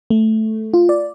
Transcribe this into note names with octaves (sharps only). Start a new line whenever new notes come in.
A3
F4
D5